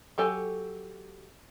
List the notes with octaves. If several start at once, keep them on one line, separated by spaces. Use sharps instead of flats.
F#3 G4 A4 G#5